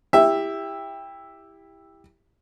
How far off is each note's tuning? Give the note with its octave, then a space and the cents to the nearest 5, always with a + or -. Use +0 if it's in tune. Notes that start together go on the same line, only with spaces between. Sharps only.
E4 +0 G4 +20 E5 +0